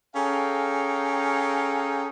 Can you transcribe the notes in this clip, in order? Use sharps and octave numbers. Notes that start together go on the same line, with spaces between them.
C#4 G#4 A4 F5 G5 A#5